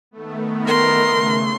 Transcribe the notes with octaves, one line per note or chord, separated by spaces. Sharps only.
D#3 A3 B3
A#4 C6
C#3